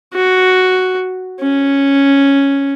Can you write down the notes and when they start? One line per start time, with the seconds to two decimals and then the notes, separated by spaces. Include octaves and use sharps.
0.14 F#4
1.40 C#4